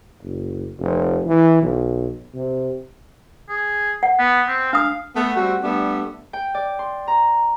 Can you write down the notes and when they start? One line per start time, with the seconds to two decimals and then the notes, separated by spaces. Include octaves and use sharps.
0.21 F#1
0.79 F1
1.26 E3
1.62 B1
2.35 C3
3.49 G#4
4.03 F#5
4.19 B3
4.48 C4
4.73 D4 F5 D#6
5.16 A3 B3
5.37 G3 A3 C4 F#4
5.63 G3 A3 B3 D4
6.33 G5
6.54 D5
6.79 C6
7.08 A#5